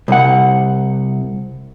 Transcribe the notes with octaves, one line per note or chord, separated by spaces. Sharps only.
C2 F#5